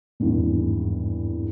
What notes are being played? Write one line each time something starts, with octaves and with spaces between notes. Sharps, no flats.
G#1 E2 G2